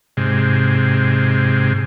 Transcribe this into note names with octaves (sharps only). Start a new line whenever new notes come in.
G#2 C3